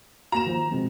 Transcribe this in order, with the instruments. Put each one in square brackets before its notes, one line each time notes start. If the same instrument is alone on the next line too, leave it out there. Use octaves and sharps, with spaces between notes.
[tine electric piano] A#3 F#4 [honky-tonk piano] A#5 E7
[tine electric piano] D#3 F3
B2 G#3 C4